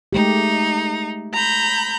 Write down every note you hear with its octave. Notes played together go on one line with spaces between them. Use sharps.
G#3 A3 D#4 G4
A#5 B5 G6